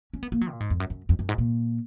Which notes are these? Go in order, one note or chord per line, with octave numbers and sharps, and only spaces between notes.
C#4
B3
A#3
F#3
A#2
G#2
F2
F#2
F#2
F2
F#2
G#2
A#2